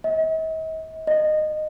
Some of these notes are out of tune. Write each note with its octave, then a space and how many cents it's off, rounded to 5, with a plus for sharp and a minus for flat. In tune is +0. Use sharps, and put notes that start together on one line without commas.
D#5 +45
D#5 -15